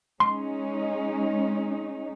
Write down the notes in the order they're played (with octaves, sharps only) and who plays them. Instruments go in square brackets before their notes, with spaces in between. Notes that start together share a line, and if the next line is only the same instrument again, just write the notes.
[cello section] G#3 C#4 D#4 [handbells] C6